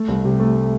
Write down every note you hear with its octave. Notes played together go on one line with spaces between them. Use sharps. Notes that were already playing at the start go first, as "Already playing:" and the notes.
Already playing: A3
C2
C3
A3